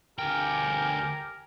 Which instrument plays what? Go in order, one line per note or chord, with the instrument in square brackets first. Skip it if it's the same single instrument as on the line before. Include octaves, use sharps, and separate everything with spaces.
[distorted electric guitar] D2 G5 [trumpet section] G4 G#5 [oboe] A#4